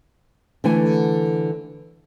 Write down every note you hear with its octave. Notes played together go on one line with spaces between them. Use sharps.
D3 E3 A3 E4 G#5